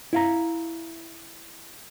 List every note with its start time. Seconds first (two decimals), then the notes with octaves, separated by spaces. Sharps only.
0.13 E4 F5 A#5